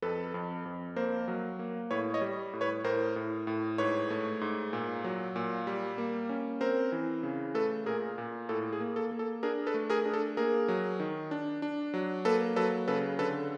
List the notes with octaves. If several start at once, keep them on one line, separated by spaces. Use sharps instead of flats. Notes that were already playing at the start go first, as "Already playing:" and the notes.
F2 A4 B4
F2
F2
A#3 A#4 C5
F#3
A#3
A2 B4 C#5
C#5 D#5
G3
A2
B4 C#5
A2 A#4 C5
A2
A2
G#2 B4 C#5
A3
G#2
A#2
F#3
A#2
G3
A#3
C#4
C4 A#4 C5
E3
C#3
A3 A4 B4
A#2 G#4 A#4
A#2
A2 A4
G#4
A#3
A4
A#3
A4
D4 G#4 A#4
A4 B4
A3
G#4 A#4
D4
A4
A#3 G#4 A#4
F#3
D#3
D4
D4
F#3
A#3 A4 B4
F#3 A4 B4
C#3 A4 B4
D3 A4 B4